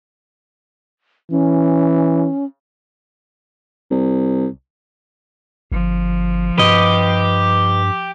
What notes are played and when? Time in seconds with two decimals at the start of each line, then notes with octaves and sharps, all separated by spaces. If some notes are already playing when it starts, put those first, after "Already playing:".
1.31 E3 C#4
3.91 C2
5.72 G1 F3
6.58 G2 G4 B4 D#5